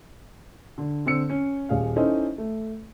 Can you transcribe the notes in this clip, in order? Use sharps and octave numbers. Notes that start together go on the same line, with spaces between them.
D3
D3 C4 E6 C#7
C#4
D#1 G#4 F5
C#4 D#4 E4 A4 C5 D#5
A3